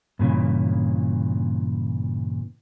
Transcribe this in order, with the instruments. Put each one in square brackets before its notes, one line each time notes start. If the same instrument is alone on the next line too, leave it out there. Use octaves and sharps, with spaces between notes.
[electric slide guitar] G2 A#2 C#3 E3